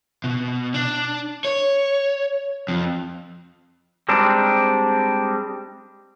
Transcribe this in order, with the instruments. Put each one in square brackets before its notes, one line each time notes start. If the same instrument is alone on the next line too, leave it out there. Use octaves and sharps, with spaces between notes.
[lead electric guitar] B2
D4
C#5
F2
[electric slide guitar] G3 G#3 C4 D4 D#4